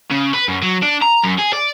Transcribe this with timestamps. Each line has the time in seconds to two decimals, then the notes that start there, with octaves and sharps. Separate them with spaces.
0.11 C#3
0.34 B4
0.48 F#2
0.62 F#3
0.83 D4
1.02 A#5
1.24 F#2
1.39 G#4
1.53 D5